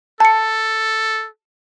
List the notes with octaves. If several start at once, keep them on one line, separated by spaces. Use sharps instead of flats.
A4 A5 C#7